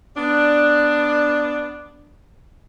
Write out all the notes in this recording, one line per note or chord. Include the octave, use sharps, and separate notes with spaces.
B3 D4